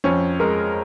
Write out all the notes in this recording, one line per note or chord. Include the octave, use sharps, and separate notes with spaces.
F2 C#4
G#3 A#4